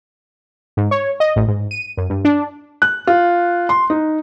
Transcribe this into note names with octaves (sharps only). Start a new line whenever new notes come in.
G#2
C#5
D#5
A1
G#2
D#7
F#2
G2
D4
F#6
F4
C6
D#4